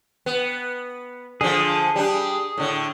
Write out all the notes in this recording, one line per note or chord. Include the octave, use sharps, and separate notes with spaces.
B3
D3 F3 G#4
G3 D4
A2 D3